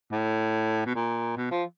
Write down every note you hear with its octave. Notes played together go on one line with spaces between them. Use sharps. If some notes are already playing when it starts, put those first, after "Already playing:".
A2
B2
A#2
B2
F3